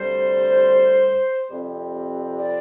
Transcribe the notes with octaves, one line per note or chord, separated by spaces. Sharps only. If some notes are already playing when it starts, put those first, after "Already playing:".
Already playing: D2 C3 G3 C5
F2 C3 G3 C4
D5